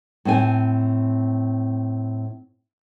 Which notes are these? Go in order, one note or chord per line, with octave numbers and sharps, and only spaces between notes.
A2 C4 G#5